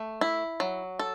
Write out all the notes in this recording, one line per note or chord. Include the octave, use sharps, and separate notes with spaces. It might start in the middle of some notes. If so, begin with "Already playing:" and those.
Already playing: A3
E4
F#3
A4